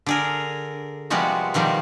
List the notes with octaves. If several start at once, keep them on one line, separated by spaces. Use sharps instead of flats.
D3 G#4 A#4
C3 F3 G3 G#3 B3 F#4
B2 D#3 F3 G3